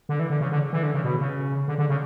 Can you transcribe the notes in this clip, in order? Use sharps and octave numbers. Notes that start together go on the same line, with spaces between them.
D3
E3
D3
C#3
D3
E3
D3
C#3
B2
C#3
D3
D3
C#3